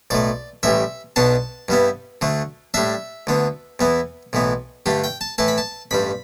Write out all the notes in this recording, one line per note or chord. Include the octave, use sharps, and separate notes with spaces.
B1 A2 A3 D5
A1 A2 E3 G3 E5
B1 B2 B3 D4 A5
G2 G3 B3 E4
D2 D3 A3
A2 G3 D4 E5
D2 D3 B3
E2 E3 B3 E4
B1 A2 E3 B3
G2 D3 A3 G4
G5
A5
A2 E3 A3 E4 A5
B5
A5
A1 G2 G3 B5